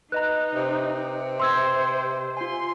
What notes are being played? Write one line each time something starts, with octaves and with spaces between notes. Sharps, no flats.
D#4 B4 D#5 A#5 F#6
C3
C5 C6 E6 G#6
F4 G#5 C6